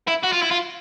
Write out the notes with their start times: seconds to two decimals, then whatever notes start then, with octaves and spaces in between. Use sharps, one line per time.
0.08 E4
0.24 F#4
0.33 F4
0.42 E4
0.51 F4